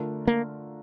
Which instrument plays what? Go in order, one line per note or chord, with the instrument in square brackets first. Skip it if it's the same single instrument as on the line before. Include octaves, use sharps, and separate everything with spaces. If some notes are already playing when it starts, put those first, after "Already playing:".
Already playing: [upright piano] D3 A3 D4 F4 A#4
[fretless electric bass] A#3